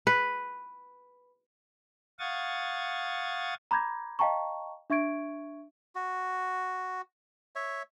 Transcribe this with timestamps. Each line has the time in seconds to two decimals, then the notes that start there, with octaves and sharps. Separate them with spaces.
0.07 B4
2.19 F5 F#5 C#6 D#6 G#6 A6
3.71 A#5 B5 D6 G6 G#6 A#6
4.19 D#5 F5 G5 A5 A#5 C#6
4.90 D4 E5 C#6 G#6 D7
5.95 F#4
7.56 C#5 E5